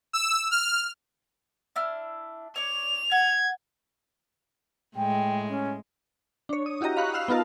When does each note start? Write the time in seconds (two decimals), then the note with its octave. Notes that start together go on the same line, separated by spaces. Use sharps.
0.13 E6
0.51 F6
1.76 D4 E4 F6
2.56 C#5 D5 F7
3.11 F#5 G#6
4.96 A2 G#3 G5
5.48 C#4
6.49 D4 C#5
6.66 D#6
6.81 E4 F#4 G4 D#5 A#5
6.97 F5 B5 C#6 F#6
7.14 F5 E6 F#6 C7 F7
7.28 B3 D#4 F4 A#4 A5